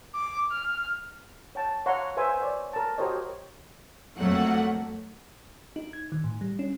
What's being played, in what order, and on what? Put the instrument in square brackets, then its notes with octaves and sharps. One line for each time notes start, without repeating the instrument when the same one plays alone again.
[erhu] D6
F6
[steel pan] C#5 G5 A5
C#5 F5 F#5 A#5 C6 C#6
B4 C5 E5 G#5 C6
C#5 D5
A#4 A5
F#4 G4 A#4 C5 C#5 D#5
[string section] F2 F#3 A3 A#3 F#5
[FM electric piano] D#4
G#6
D#3
A2
G3
C#4